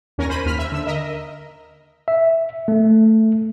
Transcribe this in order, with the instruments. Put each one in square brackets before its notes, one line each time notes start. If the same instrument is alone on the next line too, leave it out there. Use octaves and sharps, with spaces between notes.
[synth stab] D#2 C#4 A#4 G#5 A#6
C5 B5 D#7
D#2 F6 B6
E5
D3 E6
A#4 D#5 E5 A#5
[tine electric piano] E5
A3